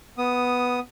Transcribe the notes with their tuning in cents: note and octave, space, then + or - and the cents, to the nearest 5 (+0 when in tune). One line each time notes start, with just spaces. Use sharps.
B3 +0 D#6 +0